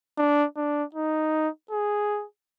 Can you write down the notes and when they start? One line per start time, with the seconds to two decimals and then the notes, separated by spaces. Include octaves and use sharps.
0.18 D4
0.56 D4
0.95 D#4
1.71 G#4